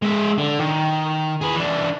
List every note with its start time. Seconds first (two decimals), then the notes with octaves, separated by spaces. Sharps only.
0.02 G#3 E5
0.38 D3
0.59 D#3
1.41 G#4 B4
1.56 E3 D4